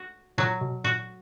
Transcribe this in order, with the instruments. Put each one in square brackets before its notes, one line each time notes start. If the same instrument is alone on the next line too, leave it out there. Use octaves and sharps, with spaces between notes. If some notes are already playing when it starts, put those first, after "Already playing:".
Already playing: [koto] F#4
[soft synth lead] A#2 [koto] F#3
[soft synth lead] B2
[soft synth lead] A#2 [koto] F#4